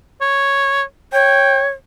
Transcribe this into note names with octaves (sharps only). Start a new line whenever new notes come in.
C#5
C#5 G5